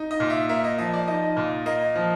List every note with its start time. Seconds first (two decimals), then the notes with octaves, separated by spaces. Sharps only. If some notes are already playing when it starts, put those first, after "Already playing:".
Already playing: D#4
0.11 D#5
0.20 A#2
0.30 E5
0.49 A#3 E5
0.64 D#5
0.78 F3 D#5
0.93 D5
1.07 D#4 D#5
1.37 A#2
1.66 A#3 D#5
1.95 F3